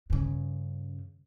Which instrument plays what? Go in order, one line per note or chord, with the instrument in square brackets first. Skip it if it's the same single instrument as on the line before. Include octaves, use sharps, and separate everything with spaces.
[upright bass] G2 C#3